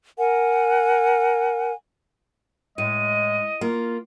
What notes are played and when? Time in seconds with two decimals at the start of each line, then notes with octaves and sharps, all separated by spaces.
0.17 A#4 F#5 G#5
2.78 A2 G#3 D#5 D#7
3.61 A#3 F4